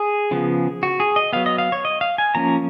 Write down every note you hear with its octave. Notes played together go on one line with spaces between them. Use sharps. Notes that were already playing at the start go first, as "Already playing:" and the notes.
Already playing: G#4
C#3 F3 B3
F#4
G#4
D#5
F#3 B3 F5
D#5
F5
C#5
D#5
F5
G#5
F3 A#3 C#4 A#5